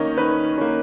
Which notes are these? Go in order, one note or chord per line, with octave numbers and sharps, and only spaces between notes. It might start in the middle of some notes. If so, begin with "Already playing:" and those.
Already playing: D#3 A#3 C#4 C#5 D#5
D#3 B4
A#3 C#4